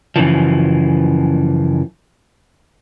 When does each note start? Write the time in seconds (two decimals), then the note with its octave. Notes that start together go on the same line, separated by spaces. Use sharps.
0.16 F#2 C#3 E3 F3